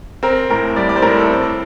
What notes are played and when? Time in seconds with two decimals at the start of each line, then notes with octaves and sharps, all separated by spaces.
0.23 C4 A#4
0.50 A2 A#4
0.76 G3 D5
0.89 D5
0.96 C5
1.02 A2 A#4
1.17 A4
1.30 C4